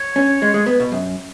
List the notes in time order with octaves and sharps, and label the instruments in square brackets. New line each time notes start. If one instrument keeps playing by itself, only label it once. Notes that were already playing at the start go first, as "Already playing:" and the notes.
Already playing: [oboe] C#5
[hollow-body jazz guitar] C#4
G#3
G#3
B3
B2
F#2